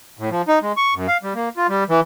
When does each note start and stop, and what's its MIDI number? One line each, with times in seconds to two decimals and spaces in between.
0.19 0.30 45
0.30 0.42 53
0.48 0.59 63
0.62 0.72 56
0.77 0.94 85
0.95 1.07 42
1.08 1.17 77
1.23 1.33 55
1.35 1.49 58
1.57 1.67 65
1.69 1.84 55
1.89 2.00 52